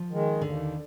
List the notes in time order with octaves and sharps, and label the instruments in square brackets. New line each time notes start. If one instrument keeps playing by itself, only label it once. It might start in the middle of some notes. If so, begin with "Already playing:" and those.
Already playing: [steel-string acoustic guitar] F3
[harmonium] D#3 G#3
[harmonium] D#2 [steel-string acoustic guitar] D3